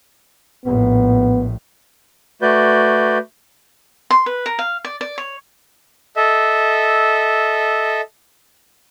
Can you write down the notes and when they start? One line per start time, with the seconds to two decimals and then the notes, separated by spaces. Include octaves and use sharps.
0.66 A#1 A2 B3
2.42 A3 F#4 B4 D5 G6
4.10 C6
4.26 B4
4.46 A#4
4.59 F5
4.85 D5
5.01 D5
5.18 C#5
6.16 A4 D#5 E5